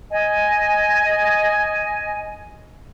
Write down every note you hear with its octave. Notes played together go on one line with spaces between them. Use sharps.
D#5 G#5